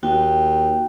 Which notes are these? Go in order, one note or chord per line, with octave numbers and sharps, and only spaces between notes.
D#2 F#4 G5